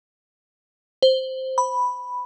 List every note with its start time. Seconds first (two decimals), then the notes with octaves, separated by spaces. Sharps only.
1.02 C5
1.58 B5